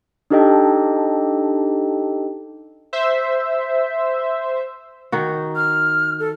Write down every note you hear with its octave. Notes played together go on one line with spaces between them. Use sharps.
D4 D#4 G4 A4 D#5 G5
C5 E5
D#3 D#4 F#4
F6
A4